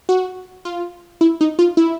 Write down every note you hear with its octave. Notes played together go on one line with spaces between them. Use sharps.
F#4
F4
E4
D#4
F4
E4